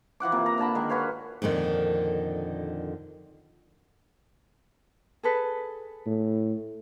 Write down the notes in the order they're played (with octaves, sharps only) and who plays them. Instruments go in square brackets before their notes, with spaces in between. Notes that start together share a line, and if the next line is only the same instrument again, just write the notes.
[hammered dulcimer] E3 F3 F#5 D6
C3 A#3
A#5
D3 A#3 A5 B5
D#3 G#3
F#4 B4 C#5 F5
[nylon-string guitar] F2 A#2 D3 D#3
[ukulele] G#4 A4 B4
[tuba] A2